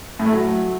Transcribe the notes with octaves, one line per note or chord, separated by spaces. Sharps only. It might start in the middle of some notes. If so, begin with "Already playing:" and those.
A2
A3
F#3